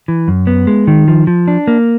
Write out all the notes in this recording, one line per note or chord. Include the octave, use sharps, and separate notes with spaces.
E3
F#2
B3
G#3
D#3
F3
F3
D4
A#3